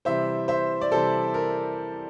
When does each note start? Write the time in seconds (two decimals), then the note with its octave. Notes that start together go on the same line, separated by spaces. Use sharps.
0.05 C3 E3 G3 C5 E5
0.48 C5 E5
0.81 D5
0.92 C3 E3 G3 A4 C5
1.34 A#4